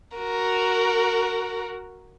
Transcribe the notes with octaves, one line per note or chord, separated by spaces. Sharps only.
F#4 A#4